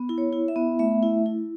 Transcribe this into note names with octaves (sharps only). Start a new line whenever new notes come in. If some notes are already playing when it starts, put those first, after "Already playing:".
Already playing: B3
E4
C#5
E4
E5
B3
A3 E5
E4
E4